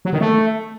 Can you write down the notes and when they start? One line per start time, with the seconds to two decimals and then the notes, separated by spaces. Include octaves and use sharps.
0.05 F#3
0.13 D#3
0.21 A3